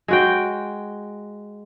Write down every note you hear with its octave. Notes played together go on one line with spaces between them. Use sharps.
G#3 F#4 G5